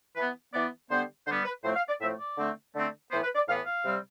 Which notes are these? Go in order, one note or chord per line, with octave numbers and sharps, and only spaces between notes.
E3 B3 B4
E3 B3 D5
D3 G3 B3 C5
D3 G3 B3 C5
B4
A2 F3 A3 C4 C5
F5
D5
A2 F3 A3 C4 E5
D5
D3 A3 C4
D3 A3 C4
A2 E3 B3 C5
B4
D5
A2 E3 B3 F5
F5
C3 G3 C4